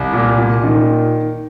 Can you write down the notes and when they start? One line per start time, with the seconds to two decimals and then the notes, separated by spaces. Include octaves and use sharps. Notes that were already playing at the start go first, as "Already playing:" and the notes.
Already playing: C2
0.13 A#2
0.38 A#2
0.64 D#3